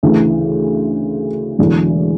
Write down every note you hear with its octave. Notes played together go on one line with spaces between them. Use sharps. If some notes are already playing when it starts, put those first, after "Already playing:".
D2 C#3 E3
E1 E2 D3 F#3